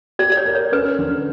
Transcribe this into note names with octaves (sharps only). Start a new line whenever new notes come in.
G4 D5
D5
C#5
A#4
C#5
C#4 B4
D3